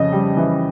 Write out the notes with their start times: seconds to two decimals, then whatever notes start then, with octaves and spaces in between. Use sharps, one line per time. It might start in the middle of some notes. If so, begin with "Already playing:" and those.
Already playing: F2 C#3 D#5
0.12 G3
0.37 E3